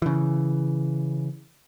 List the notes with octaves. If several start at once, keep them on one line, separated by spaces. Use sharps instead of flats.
C#3 E3